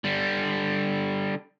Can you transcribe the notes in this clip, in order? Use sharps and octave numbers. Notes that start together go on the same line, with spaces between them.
D3 G3